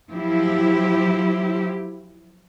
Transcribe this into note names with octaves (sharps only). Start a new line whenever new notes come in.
F3 F#3 E4 G4